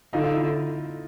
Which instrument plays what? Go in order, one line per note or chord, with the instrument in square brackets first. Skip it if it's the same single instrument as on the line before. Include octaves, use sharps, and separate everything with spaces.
[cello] D3 [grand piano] D#4 F4
[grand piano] D#4 F4
E4